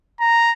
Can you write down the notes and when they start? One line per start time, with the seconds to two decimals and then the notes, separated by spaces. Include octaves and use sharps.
0.20 A#5